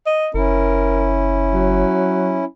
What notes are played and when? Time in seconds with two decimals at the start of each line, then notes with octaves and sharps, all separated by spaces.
0.06 D#5
0.34 F#1 C#4 E4 A#4
1.53 F#3